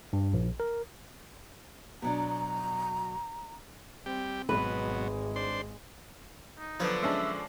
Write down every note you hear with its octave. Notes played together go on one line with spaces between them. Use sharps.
G2
A#1
A#4
B2 F#3 D4 A#5
G3 C4 G4
G#1 B2 F#3 G#3 B4
D4 C5 C6
D#4
D3 F3 F#3 B3 C#5
G#3 C#4 D4 E5